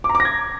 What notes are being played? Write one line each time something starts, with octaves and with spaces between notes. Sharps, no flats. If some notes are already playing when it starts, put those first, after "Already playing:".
D6
A#5
D6
A#6
G#6